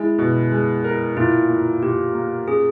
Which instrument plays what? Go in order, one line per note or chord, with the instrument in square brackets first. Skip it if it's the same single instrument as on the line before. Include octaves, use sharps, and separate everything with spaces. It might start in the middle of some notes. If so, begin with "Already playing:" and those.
Already playing: [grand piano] G#3 [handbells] E4
[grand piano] B2
G#3
A#4
[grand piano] A#2 [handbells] E4
[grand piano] A#3
[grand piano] A#2 [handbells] G4
[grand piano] A#3
[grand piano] C#4 [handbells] G#4